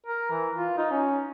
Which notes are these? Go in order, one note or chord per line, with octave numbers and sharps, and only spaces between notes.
A#4
E3
F4
D#4
C#4